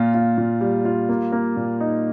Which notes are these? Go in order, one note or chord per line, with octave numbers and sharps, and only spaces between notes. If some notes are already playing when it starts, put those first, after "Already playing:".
Already playing: A#2 F4
F4
A#2
G3
F4
A#3
A#3
A#2
D#4